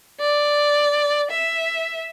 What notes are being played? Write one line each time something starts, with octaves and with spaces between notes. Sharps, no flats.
D5
E5